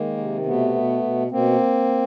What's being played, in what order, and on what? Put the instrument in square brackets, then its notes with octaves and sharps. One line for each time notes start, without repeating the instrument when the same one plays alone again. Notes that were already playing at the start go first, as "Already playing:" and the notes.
Already playing: [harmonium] D#3 G#3 A#3
C3
B2 A3 B3
B2
B2
B2 A#3 C4